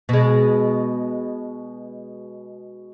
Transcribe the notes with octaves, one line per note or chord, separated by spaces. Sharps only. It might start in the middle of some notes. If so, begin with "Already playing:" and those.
B2 G#3